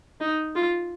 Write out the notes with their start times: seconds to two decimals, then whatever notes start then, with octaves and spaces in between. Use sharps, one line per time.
0.21 D#4
0.55 F4